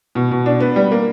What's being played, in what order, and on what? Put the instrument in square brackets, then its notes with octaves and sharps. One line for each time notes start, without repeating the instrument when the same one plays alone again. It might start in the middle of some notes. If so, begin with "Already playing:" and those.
[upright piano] B2
B2
D4
B3
G3
A#3